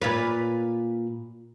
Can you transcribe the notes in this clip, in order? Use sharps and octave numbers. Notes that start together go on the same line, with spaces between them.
A#2 F4 B4